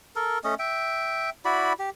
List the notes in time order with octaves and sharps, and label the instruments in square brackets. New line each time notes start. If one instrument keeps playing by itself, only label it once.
[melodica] A4 A#4
A3 C#4 D#5
E5 G5
E4 F#4 D5 B5
G4